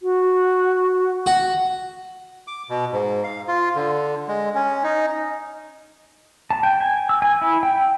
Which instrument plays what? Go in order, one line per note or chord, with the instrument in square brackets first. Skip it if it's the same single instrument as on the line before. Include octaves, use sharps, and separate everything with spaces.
[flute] F#4
[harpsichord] F#4
[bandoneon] D6
B2
G#2
F5
F4
D3
G#3
C#4
D#4
[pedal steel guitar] A5
G5
G#5
E6
G#5
E4
G5